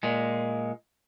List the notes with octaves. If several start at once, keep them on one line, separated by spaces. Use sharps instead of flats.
A#2 G#3